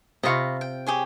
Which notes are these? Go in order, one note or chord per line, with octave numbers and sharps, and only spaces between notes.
C3 F4 D#5 F5 B5 C#6
G5
G4 G#4 C#5